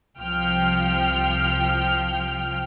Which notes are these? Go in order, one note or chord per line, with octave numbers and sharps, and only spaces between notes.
C2 F3 G5 F6